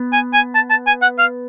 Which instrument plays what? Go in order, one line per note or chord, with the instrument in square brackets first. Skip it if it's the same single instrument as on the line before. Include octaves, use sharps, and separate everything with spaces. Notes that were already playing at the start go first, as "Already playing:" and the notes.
Already playing: [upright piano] B3
[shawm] G#5
G#5
A5
A5
G#5
F#5
F5